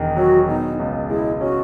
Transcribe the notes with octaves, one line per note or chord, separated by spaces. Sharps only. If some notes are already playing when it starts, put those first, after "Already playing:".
Already playing: E1 E2 D#3
F#3 F#4
B2 D#4
C#2
G#3 E4
C#4 F#4